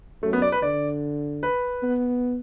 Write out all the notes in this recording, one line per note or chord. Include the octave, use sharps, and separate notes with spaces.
F#2 A3
B3
D5
B4
D3 D5
B4
B3